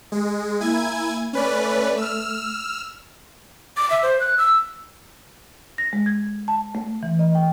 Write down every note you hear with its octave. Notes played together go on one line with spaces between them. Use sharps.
G#3
A#3 E4 G#5 G#6
A3 C#4 B4 D5
E6 F6
D6
E5
C5
F#6
E6
A#6
G#3
G#6
A5
A3
E3
D#5
G5